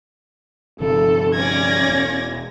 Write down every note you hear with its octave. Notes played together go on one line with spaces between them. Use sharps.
G1 C3 F3 A4
C#4 D5 G#6 A#6
E1 B2